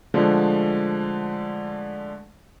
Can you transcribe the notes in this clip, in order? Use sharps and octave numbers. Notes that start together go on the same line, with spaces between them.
D3 F3 G#3 A3